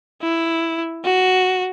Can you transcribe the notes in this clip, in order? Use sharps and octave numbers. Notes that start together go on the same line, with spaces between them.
E4
F#4